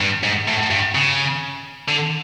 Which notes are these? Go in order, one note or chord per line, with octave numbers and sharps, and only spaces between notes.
G2
G#2
A2
G2
C#3
D3